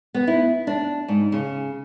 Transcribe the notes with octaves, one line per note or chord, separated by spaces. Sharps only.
B3
E4
D4
G#2
C#3